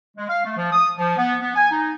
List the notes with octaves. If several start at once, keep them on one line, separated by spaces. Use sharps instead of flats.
G#3
F5
A3
F3
D#6
F3
B3
B3
G#5
D#4